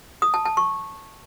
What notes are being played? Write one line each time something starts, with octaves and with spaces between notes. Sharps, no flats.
D#6
A5
A5
C#6